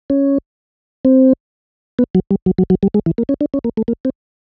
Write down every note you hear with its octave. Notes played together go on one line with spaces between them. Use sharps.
C#4
C4
B3
F#3
G3
F#3
F#3
F#3
G3
G#3
E3
A#3
C#4
D4
C#4
A#3
A3
A#3
C4